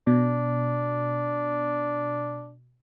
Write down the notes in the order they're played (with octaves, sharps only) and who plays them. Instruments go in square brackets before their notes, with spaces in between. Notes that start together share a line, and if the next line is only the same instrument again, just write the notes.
[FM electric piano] B2 [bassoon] D4